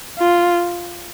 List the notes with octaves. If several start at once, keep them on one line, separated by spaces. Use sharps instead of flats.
F4